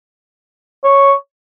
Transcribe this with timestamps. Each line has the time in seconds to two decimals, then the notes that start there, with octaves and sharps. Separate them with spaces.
0.83 C#5